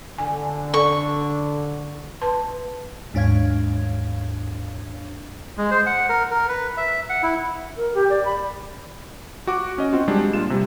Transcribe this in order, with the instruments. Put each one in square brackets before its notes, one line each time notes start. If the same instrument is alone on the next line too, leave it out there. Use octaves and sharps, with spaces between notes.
[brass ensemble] D3 [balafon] G#5
[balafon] A4 D5 [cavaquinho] C#6
[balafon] B4 A5 C6
[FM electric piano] D#2 G#2 D4 C#5 F5 G#6
[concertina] G#3
C5
F#5
A#4
A#4
B4
E5
F#5
E4
[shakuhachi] A#4
G4
D5
B5
[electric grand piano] F#4 F#5 D6
C#4 D#5
C4 F4 F#4
G3 G#3 D4
A#2 F4 E7
C3 G3